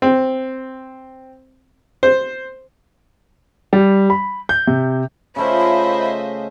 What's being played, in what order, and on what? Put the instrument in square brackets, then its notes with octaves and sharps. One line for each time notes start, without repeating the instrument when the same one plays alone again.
[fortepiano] C4
C5
[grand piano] G3
B5
G6
C3
[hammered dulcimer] C#3 A3 F4 [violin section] C5 D#5 E5 [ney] B5